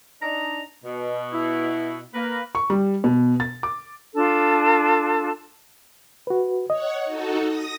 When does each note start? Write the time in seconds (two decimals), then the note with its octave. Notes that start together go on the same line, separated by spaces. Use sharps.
0.22 D4 D#4 A#5
0.85 B2
1.32 E4
2.14 A#3 A#4 B4
2.55 C#6
2.70 G3
3.04 B2
3.40 A6
3.63 D6
4.15 D4 F4 A4
6.27 F#4 B4
6.70 C#5 D#5 F#5
7.05 D#4 F#4 A4
7.45 D#6 A#6